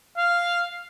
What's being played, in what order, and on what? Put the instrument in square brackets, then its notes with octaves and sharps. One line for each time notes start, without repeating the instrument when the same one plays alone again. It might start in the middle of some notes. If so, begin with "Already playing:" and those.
[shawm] F5